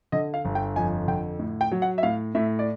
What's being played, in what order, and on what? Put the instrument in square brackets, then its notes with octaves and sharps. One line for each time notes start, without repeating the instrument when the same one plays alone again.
[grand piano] D3 D#5
F5
G1
G5
F2 G#5
D3 G5
A2
G5
F#3
F#5
E5
A2 F5
A2 E5
D5